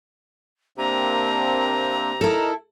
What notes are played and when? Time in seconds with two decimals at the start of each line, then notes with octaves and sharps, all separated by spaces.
0.78 C3 A#3 C4 D4 A#5
2.21 D#4 E4 A4 A#4